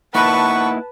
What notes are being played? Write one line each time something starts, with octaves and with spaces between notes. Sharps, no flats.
A#3 D#4 E4 B4 F#5 A5 C#6